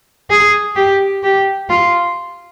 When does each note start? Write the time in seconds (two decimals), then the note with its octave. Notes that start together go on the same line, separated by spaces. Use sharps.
0.30 G#4
0.76 G4
1.23 G4
1.69 F4